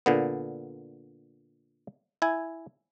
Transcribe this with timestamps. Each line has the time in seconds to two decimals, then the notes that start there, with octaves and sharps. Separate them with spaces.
0.06 A#2 D3 B3
2.22 E4 G#5